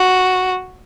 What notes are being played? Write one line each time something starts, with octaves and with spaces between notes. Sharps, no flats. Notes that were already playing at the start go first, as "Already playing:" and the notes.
Already playing: F#4